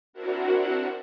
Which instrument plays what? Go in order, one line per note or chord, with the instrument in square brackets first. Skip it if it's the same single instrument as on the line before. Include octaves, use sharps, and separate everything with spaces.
[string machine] C4 D4 E4 F#4 A#4 F#5